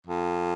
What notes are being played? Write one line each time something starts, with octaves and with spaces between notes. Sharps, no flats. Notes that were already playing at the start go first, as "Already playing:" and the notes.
F2